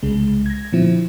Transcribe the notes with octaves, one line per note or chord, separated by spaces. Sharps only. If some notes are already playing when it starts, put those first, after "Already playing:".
C2 C#3 G#3
G#6 A#6
A#2 D3 F3 C4 E4